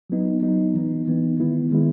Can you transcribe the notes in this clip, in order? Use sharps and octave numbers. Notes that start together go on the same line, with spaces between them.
F#3 B3 D#4
F#3 B3 D#4
E3 B3 D#4
E3 B3 D#4
D#3 G#3 B3 E4
D#3 G#3 B3 E4